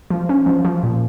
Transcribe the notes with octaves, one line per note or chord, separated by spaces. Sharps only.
F3
C#4
F3
F3
A#2